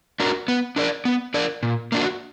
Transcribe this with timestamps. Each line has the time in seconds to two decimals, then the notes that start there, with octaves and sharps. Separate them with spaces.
0.20 D4 F#4 A#4
0.48 B3
0.76 D4 A#4 D5
1.05 B3
1.34 D4 A#4 D5
1.63 A#2
1.92 A#3 D4 F#4